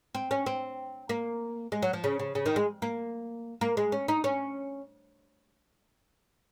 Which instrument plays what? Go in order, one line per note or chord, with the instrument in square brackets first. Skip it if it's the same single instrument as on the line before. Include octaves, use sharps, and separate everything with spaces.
[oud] C4
C#4
C4
A#3
G#3
F#3
F3
C#3
C#3
C#3
D#3
G#3
A#3
A#3
G#3
C#4
D#4
C#4